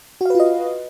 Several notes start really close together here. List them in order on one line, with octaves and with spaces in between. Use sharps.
F#4 F5 B4 F4 D#5